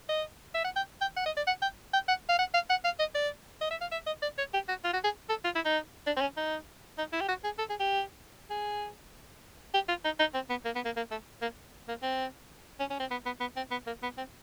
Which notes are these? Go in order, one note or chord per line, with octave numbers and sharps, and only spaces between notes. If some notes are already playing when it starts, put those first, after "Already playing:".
D#5
E5
F#5
G5
G5
F#5
D#5
D5
F#5
G5
G5
F#5
F5
F#5
F5
F#5
F5
D#5
D5
D#5
E5
F5
E5
D#5
D5
C#5
G4
F#4
F4
F#4
G#4
A4
F4
E4
D#4
D4
C4
C#4
D#4
D#4
E4
G4
F#4
G#4
A4
G#4
G4
G#4
G4
F4
D#4
D#4
C4
B3
A#3
B3
A#3
A#3
A3
A#3
A#3
C4
C#4
C#4
C4
B3
B3
B3
C4
B3
A#3
B3
C4